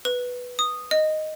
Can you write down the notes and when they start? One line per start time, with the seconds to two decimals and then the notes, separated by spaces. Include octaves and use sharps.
0.05 B4
0.59 D#6
0.91 D#5